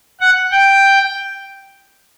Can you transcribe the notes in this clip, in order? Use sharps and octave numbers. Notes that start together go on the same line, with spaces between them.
F#5
G5